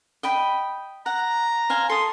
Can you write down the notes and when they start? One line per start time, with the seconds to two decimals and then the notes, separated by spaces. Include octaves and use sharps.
0.23 D#5 G5 B5
1.06 F#5 A#5
1.70 C5 F5 G#5
1.90 A4 C6 D#6